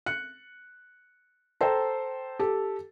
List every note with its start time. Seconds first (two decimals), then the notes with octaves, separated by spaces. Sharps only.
0.06 F#6 C#7
1.61 A4 C5 G5 A#5
2.39 G4 A4